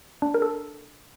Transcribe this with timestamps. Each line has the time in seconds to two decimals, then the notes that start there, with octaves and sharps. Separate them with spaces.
0.22 D4
0.34 A#4
0.42 A4